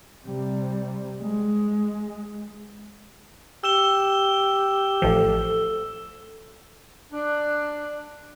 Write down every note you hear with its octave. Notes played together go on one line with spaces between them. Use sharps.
C3 G3
G#3
G4 E6 E7 G7
A1 F3 A4
D4